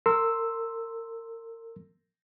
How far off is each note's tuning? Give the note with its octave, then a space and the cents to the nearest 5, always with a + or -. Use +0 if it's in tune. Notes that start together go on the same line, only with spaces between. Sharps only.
A#4 -35 C6 +0 E6 +0